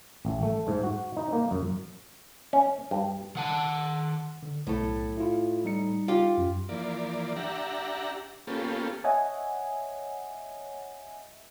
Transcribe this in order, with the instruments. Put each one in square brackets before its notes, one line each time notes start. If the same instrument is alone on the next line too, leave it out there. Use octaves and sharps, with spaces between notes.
[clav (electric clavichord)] A1
A3
G#2
F#4
D#4
A#3
F#2
C#4
G2
[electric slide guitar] D#3 F#5 A5
[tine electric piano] D3
[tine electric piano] B1 [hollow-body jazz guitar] A2 A3
[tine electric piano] E4 F4
G3 D#4 C#7
[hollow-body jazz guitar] F4 G4
[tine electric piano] F#2
[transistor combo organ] E3 F3 A#3 D5
D4 G4 E5 F#5 A#5
A#3 B3 C#4 F4 G4 A4
[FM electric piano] C#5 D#5 E5 F#5 G#5